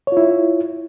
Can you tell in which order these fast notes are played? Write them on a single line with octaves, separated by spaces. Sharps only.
C#5 F4 E4